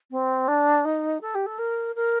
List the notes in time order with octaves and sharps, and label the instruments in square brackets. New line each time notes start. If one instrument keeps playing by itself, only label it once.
[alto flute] C4
D4
D#4
A4
G4
A4
A#4
A#4